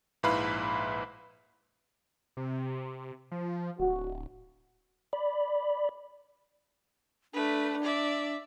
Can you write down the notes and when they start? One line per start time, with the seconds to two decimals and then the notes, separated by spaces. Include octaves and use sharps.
0.23 A#1 G#2 E4 B4 F5 B5
2.37 C3
3.31 F3
3.79 D1 F#4
5.13 D5 B5
7.34 A3 D4 B4
7.84 D5 E5